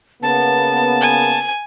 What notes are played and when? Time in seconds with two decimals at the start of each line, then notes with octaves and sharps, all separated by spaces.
0.23 C#3 A#3 B3 A5
1.01 G#5